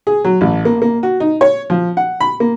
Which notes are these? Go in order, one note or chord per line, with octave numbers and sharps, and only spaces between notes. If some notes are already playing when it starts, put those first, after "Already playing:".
G#4
F#3
A1
A#3
A#3
F#4
D#4
C#5
F3
F#5
B5
A#3